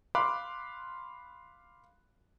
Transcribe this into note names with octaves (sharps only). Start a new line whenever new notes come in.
F5 B5 C6 D6 F#6